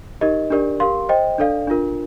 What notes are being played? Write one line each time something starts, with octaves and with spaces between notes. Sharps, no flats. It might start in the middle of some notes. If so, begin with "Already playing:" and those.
D#4 G4 A#4 D#5
D4 G4 A#4 D5
G4 A#4 F5 C6
C5 D#5 G5
D4 A4 D5 F5
D4 F4 A#4